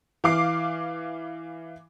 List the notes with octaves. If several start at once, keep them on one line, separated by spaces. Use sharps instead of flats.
E3 F5 D6 C7